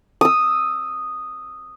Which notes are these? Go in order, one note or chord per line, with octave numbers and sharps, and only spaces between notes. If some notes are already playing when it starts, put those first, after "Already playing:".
D#6 E6